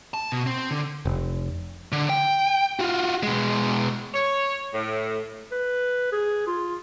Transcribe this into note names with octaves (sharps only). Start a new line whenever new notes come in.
A5
B2
C4
D3
F1
D3
G5
F4 F#4
B2 G#3
C#5
A2
B4
G#4
F4